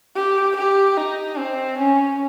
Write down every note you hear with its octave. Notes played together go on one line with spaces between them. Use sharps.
G4
G4
D#4
C4
C#4